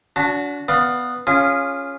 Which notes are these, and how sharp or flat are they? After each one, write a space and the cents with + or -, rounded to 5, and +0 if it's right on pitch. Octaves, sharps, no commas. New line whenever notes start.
D4 -35 F#4 -10 A5 +10
B3 +0 D5 +20 F5 +10
C#4 +0 F4 +0 G#4 -20